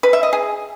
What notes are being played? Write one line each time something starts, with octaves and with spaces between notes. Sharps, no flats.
B4
E5
D#5
G#4